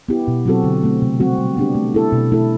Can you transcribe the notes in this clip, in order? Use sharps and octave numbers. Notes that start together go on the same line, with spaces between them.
B3 E4 G4
B2
F#3 C4 F#4 A4
D3
A3 C4
C3
G3 C4 F#4
G3
B3 D4 G4
A3
E4 A4
B2
A3 E4 A4